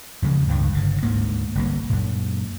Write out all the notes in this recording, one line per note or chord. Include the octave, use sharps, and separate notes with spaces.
E2 C#3 F3 G#3
C#2 G2 D#3
G1 C#3
D2 G#2 A#3
G1 C2 A#3
F#2 A#2